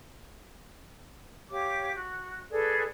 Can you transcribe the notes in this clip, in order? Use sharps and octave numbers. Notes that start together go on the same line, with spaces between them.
G4 C#5 F5 D6
F#4
G#4 A4 B4 D5